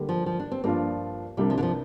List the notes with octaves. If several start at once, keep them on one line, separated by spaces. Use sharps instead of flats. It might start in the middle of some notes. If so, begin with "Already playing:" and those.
Already playing: D3 G3 A#3 G4
F3
F3
D4
C4
G2 F3 A#3 D4 F4
C2 C3 G3 A#3 D4
F3
D3
F3